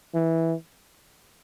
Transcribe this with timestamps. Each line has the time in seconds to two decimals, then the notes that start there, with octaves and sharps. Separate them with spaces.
0.15 E3